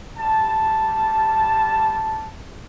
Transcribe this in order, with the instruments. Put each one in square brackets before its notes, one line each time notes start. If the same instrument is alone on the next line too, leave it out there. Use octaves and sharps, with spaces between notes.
[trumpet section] G3 A5